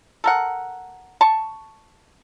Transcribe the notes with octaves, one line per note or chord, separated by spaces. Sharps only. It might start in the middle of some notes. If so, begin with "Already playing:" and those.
A4 A#4 F#5
A5 C#6